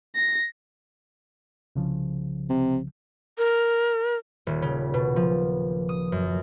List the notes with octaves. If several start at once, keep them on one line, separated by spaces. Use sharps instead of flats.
A#6
C2 C#3 F3
C3
A#4
D#1
C#3
B2
F3
D#6
F#2